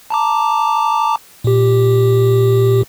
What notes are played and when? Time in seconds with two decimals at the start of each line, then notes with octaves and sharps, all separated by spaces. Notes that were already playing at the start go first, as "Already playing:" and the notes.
0.10 A5 A#5 D6
1.44 A#2 G4